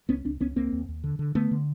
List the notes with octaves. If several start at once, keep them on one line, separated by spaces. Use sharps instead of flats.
C#2 B3 C#4
C#2 C4 D4
C#2 B3 C#4
C#2 A#3 C4
D#2
D#2
D3
D3
D3 A3 B3
D3